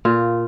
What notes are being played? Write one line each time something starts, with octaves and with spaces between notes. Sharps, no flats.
A#2 F4